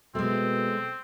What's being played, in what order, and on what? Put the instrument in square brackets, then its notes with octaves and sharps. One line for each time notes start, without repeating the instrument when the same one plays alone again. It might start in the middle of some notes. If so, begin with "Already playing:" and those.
[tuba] B2 [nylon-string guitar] G#3 A3 [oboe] C4